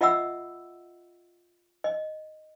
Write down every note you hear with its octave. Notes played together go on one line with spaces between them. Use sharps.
F4 D#5 E5 F#5 B5 E6
D#5